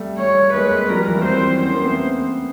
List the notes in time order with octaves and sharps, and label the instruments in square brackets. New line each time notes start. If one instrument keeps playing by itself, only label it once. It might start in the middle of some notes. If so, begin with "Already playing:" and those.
Already playing: [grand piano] G3 A3
[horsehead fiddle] C#5
[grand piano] G#3 A#3 [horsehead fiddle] B4
[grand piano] G#3 A#3
[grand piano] F3 G3 [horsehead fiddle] A#4
[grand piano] E3 F#3
[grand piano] A#3 C4 [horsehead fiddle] C5
[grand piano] B3 C#4 [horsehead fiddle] C5
[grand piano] A#3 C4
A3 B3